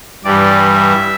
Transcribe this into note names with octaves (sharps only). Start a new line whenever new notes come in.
G2 E3 G3 D5
E5